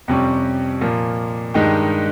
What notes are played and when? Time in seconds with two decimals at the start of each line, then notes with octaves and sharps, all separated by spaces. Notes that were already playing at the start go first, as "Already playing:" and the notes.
0.08 F2 C3 G3 C#4
0.81 A#2 F3 A#3
1.54 G2 D#3 G#3 D#4 G4